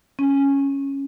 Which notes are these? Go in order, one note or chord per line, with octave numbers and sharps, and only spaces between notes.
C#4